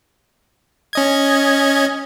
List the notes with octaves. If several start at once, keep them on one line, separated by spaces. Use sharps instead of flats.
C#4 D#5 G#6